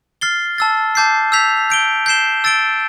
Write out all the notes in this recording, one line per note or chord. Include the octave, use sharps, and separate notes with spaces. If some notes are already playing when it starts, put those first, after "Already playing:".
F6 A6 C7 G7
A5 E6 A6
A5 D6 G6 C7
E6 G6 B6 F7
G6 D7 G7
G6 C7 E7 G7
E6 A6 D7 G7